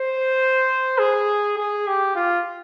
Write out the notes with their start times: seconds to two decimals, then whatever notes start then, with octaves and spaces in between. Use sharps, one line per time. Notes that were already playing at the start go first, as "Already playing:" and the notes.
Already playing: C5
0.98 G#4
1.57 G#4
1.87 G4
2.15 F4